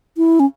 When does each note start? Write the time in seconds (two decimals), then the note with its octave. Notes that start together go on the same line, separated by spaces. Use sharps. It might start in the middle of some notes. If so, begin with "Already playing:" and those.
0.17 E4
0.40 C#4